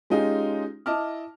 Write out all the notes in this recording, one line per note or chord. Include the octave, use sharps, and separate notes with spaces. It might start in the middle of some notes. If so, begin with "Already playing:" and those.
G#3 C#4 D#4 F4 G4 G#4
E4 D#5 A5 D6 F6